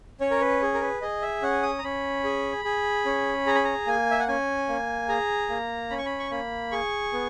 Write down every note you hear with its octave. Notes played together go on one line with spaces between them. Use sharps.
C#4 C#5
A#4
B4
G#4
A#4
B4
G#4 D#5
E5
C#4 F#5
D#6
A#5
C#4 B5
G#4
G#4
C#4
G#4 A#5
B5
A#5
A#3 G#5
E5
F#5
C#4 G#5
A#3
G#4 A#5
A#3
C#4 B5
C#6
B5
C#6
A#3 B5
G#4 C#6
B3